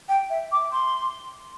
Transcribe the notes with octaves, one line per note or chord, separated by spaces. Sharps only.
G5
E5
D6
C6